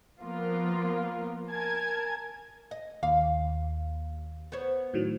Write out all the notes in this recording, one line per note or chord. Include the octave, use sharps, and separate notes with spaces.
F3 A#3 B3 F4 A#4
A#4 G#5 A5 G#6
D#5
D#2 F5
B3 C5 C#5
A2 D#3 F#3